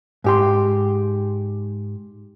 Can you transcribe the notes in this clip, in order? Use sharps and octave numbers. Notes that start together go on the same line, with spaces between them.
G#2 G4 C6